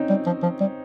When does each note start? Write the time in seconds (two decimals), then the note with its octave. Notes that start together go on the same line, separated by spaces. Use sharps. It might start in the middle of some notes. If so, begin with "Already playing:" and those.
Already playing: C4 C#4 D#4
0.10 G3
0.26 F3
0.43 F3
0.61 G3